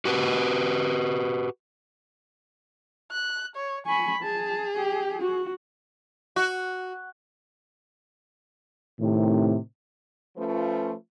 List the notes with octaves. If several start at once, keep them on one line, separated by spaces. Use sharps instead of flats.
F#4 G4 B4
F#6
C#5
G#5 B5 C#6
G#4 A5
G4
F#4
F#4
A2 C3 D#3
F3 A3 C#4 F4 B4